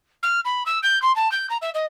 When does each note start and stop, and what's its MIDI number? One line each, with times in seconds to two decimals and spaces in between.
0.23 0.40 89
0.45 0.64 83
0.66 0.79 88
0.83 1.02 91
1.02 1.14 84
1.16 1.31 81
1.32 1.47 91
1.50 1.57 82
1.62 1.70 76
1.74 1.85 75